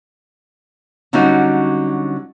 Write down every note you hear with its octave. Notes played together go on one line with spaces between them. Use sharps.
D3 F#3 G3 C#4 D#4 F#4